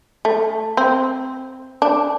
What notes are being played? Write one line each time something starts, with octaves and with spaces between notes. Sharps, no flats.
A3
C4
D4